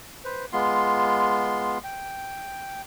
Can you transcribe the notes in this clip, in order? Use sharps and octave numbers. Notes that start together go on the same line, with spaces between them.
B4 C5
G#3 B3 F4 C6
G5